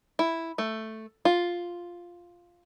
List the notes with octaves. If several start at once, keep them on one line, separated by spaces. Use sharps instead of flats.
E4
A3
F4